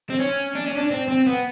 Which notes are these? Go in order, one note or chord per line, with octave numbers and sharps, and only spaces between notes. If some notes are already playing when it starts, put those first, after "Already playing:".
C4
C#4
D4
C#4
D4
C4
C4
B3